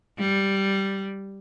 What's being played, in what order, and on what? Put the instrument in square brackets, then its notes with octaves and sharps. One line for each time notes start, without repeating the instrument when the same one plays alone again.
[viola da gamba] G3